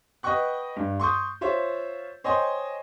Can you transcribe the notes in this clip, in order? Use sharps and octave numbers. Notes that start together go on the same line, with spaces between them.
B4 D#5 F#5 G5 C#6 F#6
G2
C6 C#6 D#6 G6
F4 C5 C#5 E5
C5 C#5 D#5 G5 G#5 C6